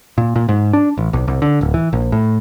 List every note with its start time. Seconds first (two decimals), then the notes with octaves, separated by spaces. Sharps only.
0.18 A#2
0.36 A#2
0.49 G#2
0.73 D4
0.98 A1
1.13 B1
1.28 C2
1.42 D3
1.61 D1
1.74 E3
1.93 A#1
2.12 A2